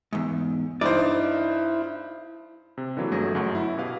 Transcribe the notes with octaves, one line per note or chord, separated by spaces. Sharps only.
E2 G#2
G2 D#4 E4 C5 D5
C3
D3 E3 F#3 A#3
G1 F#3 A3 G#4 A#6
G1 F#2 A#4 F#5 C#6
E4
B2 G4 B4 F5